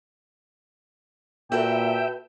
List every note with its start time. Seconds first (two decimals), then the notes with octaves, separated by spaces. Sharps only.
1.52 A#2 F#4 A4 B4 E5 G5